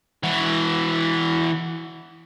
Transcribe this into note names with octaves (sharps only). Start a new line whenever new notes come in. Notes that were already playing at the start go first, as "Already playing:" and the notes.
E3 F#4